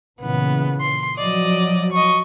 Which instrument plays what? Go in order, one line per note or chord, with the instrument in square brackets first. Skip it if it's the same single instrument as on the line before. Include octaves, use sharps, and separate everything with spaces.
[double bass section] A#2 C#3 E3 [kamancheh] B3
[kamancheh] C6
[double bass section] F3 F#3 [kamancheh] D5 D#5
[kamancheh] D#5 C#6